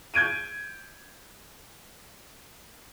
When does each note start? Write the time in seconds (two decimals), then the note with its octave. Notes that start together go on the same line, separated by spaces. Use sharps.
0.14 G6 G#6 D7 D#7